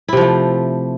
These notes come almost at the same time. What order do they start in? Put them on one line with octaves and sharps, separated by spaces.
E4 C3 F3 A3